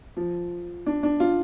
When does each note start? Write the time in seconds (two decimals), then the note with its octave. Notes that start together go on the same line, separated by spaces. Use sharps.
0.17 F3
0.86 D4
1.03 D4
1.20 F4